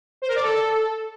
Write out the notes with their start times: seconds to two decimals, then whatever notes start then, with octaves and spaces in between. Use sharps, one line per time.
0.22 C5
0.29 A#4
0.35 D5
0.42 A4